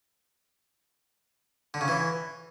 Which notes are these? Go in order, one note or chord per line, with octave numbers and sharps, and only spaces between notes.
D3
C#3
E3